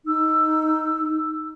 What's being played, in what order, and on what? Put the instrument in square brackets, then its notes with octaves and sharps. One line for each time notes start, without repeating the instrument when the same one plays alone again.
[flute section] D#4 E6